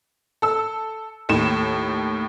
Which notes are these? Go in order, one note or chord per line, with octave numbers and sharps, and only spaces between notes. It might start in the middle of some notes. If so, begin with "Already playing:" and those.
A4 E6
D#2 A2 E7